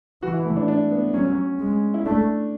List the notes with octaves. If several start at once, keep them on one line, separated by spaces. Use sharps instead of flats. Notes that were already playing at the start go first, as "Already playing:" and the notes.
E3 F#4
E4
A3
D4
D4
B3
F#3 C#4
G#3
E4
A3 D4